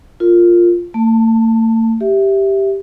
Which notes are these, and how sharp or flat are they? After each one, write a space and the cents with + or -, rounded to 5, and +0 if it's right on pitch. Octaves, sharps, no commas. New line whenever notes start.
F4 +0 A#4 -15
A3 +45 A5 +15
G4 +0 E5 +0